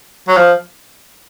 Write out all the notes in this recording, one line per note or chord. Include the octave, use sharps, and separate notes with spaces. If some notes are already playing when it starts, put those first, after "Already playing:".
F#3
F3